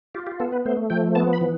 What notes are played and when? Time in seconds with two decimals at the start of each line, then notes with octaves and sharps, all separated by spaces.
0.15 F4 G4
0.27 G4
0.40 B3 A4
0.52 B4
0.65 A3 C5
0.90 F3 G5
1.15 B3 A5
1.33 B5
1.41 E3